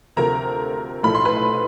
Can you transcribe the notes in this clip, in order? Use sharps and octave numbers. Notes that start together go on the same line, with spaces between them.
D2 C3 F3 A3 A#4 A#5
B1 A2 F3 A3 B5
C6
B4 B5